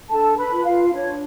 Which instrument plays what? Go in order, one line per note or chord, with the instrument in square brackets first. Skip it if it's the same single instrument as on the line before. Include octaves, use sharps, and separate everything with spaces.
[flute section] D4 A4 A5
B4 B5
F4
B4
F4 F5
D4 C#5